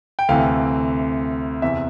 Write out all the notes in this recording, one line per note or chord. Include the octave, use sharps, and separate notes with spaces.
G5
D2 C3 E3 F5
E2 C3 E3 E5